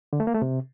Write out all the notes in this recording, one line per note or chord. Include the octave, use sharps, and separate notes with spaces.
D3
A3
A#3
A3
C3